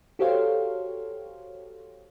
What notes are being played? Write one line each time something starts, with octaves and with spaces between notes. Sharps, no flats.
F#4 G4 A4 C5 C#5 F5